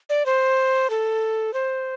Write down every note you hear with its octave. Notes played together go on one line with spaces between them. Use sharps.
D5
C5
A4
C5